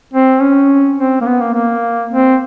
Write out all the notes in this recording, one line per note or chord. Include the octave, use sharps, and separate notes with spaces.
C4
C#4
C4
A#3
B3
A#3
A#3
C4